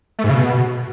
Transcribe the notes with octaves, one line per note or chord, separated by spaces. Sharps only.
A3
G#2
C#3
B2